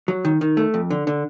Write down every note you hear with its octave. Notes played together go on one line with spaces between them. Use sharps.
F#3
D#3
D#3
A3
F2
D3
D3